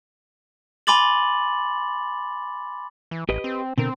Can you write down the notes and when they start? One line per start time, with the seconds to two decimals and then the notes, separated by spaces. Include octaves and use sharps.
0.87 G#5 B5 C6 D6 A6 F#7
3.11 E3
3.29 A1 G4 B4 D#5
3.44 C4
3.78 B2 D3 C4 A#4